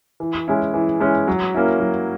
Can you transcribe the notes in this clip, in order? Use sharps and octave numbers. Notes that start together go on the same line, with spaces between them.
E3
G#3 C#4 E4
E3
G#3 C#4 E4
F#3
A#3 C#4 E4
F#3